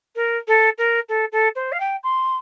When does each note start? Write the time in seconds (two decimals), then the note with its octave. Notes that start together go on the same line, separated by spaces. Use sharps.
0.15 A#4
0.48 A4
0.78 A#4
1.09 A4
1.32 A4
1.55 C5
1.72 F5
1.80 G5
2.03 C6